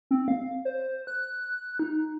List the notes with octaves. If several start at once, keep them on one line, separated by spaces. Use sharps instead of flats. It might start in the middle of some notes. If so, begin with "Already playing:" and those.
C4
F5
C5
F#6
D#4